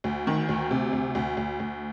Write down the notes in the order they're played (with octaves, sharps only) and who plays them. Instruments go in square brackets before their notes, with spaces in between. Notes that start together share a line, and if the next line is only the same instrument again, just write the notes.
[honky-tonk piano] D2
D#3
D2
C3
D2
D2
D2
D2